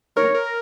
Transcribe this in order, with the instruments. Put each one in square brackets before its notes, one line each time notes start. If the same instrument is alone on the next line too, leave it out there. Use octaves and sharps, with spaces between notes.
[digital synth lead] A#4 [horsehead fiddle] C#5
[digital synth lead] A#4